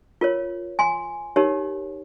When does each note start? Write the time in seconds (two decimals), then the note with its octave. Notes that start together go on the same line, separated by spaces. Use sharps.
0.21 F4 A#4 C#5
0.79 G#5 C6
1.36 D#4 G4 A#4 C#5